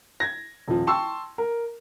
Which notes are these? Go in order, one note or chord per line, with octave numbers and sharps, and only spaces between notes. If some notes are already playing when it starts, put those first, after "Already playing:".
G#6 A#6
D#1 F3
G5 A5 C6 C#6 E6
A#4